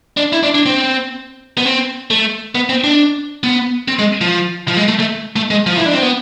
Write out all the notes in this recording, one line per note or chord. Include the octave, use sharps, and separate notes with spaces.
D4
E4
D4
D4
C4
B3
C4
A3
B3
C4
D4
B3
C4
G#3
F3
F3
G#3
A3
A3
A3
G#3
F3
E4
D4
C4
B3